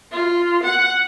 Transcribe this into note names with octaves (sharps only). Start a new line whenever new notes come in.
F4
F#5